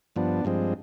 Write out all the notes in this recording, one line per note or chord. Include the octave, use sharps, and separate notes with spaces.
G2 F3 B3 D4
G2 F3 G#3 C4